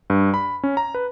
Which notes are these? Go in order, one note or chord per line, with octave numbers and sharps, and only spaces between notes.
G2
B5
C#4
A#5
B4